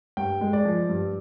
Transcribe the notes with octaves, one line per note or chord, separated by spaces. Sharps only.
G2 G5
G#3
D5
F3
G2